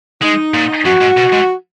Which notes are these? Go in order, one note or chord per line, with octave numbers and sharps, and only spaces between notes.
G#3 D#4
A#2
F#2 F#4
G#2
B2
G#2